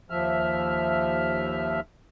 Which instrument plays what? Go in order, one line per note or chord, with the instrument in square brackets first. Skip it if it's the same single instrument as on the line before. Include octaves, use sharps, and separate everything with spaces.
[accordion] D#2 F3 E5 F6